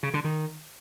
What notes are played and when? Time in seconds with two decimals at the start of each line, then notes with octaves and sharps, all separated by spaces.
0.03 C#3
0.14 D3
0.24 D#3